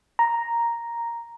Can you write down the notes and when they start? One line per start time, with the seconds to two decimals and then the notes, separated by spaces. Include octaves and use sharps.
0.19 A#5